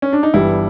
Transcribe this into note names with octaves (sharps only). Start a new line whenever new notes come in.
C#4
D4
D#4
G1 G2 E3 G3 E4